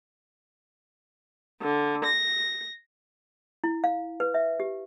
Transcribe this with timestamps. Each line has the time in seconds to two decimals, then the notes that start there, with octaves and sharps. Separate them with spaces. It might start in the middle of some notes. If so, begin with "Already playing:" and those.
1.61 D3
2.05 A#6
3.64 E4
3.84 F5
4.20 B4
4.34 E5
4.60 G4